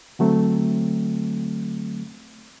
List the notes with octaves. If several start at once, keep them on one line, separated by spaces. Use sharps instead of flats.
D3 F#3 A3 C4